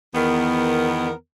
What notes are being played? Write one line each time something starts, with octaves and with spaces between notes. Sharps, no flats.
E2 D#3 B3 A#4